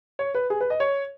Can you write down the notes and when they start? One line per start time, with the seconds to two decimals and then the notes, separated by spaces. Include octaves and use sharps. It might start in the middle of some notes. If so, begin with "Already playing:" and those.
0.19 C#5
0.35 B4
0.50 G#4
0.61 B4
0.70 D#5
0.80 C#5